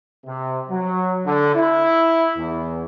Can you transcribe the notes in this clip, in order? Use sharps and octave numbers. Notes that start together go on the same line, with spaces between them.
C3
F#3
D3
E4
E2